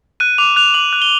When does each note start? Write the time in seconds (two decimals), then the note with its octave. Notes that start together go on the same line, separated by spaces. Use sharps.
0.20 F#6 D#7
0.38 D6 F7
0.56 F#6 F7
0.74 D6 F#7
0.93 F#6
1.02 G7